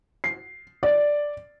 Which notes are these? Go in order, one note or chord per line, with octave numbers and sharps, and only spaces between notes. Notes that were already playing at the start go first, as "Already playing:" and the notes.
C7
D5